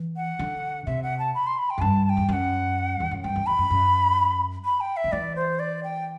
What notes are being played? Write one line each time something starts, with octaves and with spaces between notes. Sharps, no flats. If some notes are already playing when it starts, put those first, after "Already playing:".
Already playing: E3
F#5
D3
C3 E5
F#5
A5
B5
C6
B5
G5
F#2
G2 A5
A5
G5
E2
F#2 F#5 G5
E2
F#2
G2 G5
F#2
E2 B5
F#2
F#2
B5
G5
E5
D3
E3 D5
C5
D5
G5